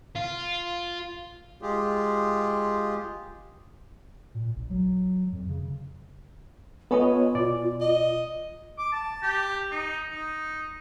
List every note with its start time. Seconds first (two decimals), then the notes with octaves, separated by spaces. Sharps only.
0.15 F4
1.62 G#3 F4 G4 G#4
4.35 A#2
4.56 A#1
4.70 F#3
5.32 F2
5.49 C#3
6.91 B3 F4 A4 B4 C#5 D#5 G#5
7.35 B2 D5
7.81 D#5
8.78 D6
8.92 A5
9.22 G4
9.71 D#4
10.11 D#4